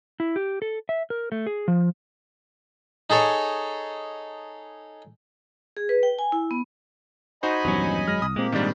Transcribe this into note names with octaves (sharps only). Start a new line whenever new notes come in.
E4
G4
A4
E5
A#4
A3
G#4
F3
D#4 G#4 A4 C#5
G#4
B4
G5
G#5
E4
B3
D#4 F#4 C5 D#5 G#5 B5
A#1 E2 G2 F#3 C#4
G#1 F#2 G#3 F6 A#6
C2 D#6
A#2 G#3 A#3 C4 G4
G#2 D#3 G3 G#3 D4